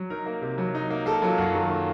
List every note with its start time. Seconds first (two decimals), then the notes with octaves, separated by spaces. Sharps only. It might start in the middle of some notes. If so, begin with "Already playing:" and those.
Already playing: F#3
0.10 D#4 A#4
0.26 A#3
0.41 C3
0.58 F#3
0.75 D#4
0.90 A#3
1.06 A#3 A4
1.22 F#3 F4
1.38 F#2 F#4
1.54 D#3 A4
1.70 A#3